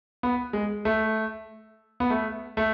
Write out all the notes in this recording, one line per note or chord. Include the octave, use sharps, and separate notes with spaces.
B3
G#3
A3
B3
A3
A3